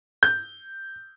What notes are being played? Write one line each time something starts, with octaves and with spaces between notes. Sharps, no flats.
G6